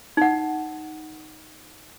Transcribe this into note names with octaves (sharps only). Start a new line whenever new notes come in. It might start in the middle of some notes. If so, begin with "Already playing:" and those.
D#4 F#5